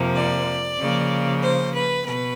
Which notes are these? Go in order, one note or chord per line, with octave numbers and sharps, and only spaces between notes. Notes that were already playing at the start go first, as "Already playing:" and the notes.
Already playing: F2 C3 F3 A#3
D5
C#3 F3 A#3
C5
B4
B2 B4